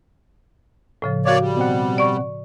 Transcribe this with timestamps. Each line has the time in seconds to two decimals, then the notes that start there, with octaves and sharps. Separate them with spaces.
1.02 A2 C#3 F3
1.26 A#3 F#4 C#5 D5 F5 D6
1.40 G3
1.57 B2 C4 F#5
1.98 D5 C#6